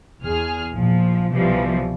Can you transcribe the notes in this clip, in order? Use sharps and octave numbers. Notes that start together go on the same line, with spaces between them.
E2 G#4 F6
A#1 F3
C2 B2 E3 F3 G3